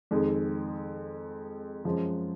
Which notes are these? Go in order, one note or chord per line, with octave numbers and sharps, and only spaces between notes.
F2 D#3 G#3
F#2 F3 G#3